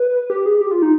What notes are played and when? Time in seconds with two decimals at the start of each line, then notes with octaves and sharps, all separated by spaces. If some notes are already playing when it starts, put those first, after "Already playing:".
Already playing: B4
0.30 G4
0.46 G#4
0.60 G4
0.71 F4
0.82 D#4